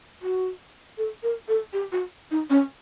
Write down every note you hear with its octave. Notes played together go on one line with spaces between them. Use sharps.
F#4
A4
A#4
A4
G4
F#4
D#4
C#4